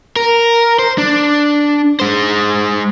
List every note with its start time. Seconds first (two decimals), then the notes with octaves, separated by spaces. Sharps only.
0.16 A#4
0.79 C5
0.98 D4
2.00 G#3 C5